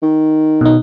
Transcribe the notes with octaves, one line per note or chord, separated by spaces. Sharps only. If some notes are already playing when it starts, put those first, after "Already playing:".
D#3
B2 D#4